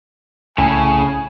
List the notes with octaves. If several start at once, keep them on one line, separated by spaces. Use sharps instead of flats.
C2 A2 C#3 G#5